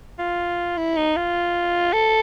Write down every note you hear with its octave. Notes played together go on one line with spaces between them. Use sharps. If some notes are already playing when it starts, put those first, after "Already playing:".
F4
E4
D#4
F4
A4